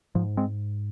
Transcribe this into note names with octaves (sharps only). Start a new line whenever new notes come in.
G#2 F3
G#3 C4